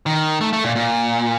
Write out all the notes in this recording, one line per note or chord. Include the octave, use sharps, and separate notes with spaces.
D#3
A3
A3
A#2
A#2